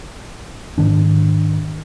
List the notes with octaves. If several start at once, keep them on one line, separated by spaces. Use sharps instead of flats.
G#2 D#3 D4